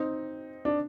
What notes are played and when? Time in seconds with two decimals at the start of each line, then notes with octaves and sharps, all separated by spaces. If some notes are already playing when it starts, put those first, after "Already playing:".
Already playing: C4 D#4
0.65 D4